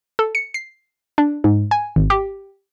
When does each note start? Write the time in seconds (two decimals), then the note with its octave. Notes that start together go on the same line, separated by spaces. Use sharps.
0.19 A4
0.35 C#7
0.54 C7
1.18 D4
1.44 G#2
1.71 G#5
1.96 G#1
2.10 G4